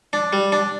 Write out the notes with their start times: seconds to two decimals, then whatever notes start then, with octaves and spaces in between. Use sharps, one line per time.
0.13 D4
0.33 G3
0.52 D4